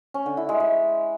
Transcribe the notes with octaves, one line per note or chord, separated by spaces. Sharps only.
C#4
D3
E4
G#3
G#3